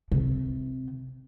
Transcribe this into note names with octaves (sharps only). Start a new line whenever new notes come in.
C3